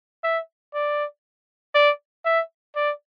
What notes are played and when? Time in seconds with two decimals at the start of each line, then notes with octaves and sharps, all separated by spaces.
0.24 E5
0.74 D5
1.75 D5
2.25 E5
2.76 D5